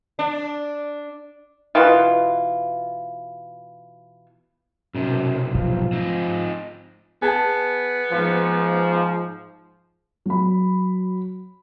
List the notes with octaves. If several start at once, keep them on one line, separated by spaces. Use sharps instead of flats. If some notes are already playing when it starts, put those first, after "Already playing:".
D4
B2 E3 E4 F4
B1 F#2 C3
G#2 F3
C4 D#4
B3 G#4 A5
G#2 F3
F#3 B5